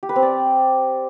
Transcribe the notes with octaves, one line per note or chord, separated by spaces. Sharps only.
G4
B4
C4
D5